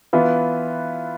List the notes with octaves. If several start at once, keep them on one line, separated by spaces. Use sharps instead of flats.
E3 B3 F4 B4 E5